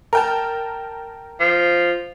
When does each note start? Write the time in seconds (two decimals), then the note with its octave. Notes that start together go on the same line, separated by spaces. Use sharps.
0.13 A#4 G5 A5
1.40 F3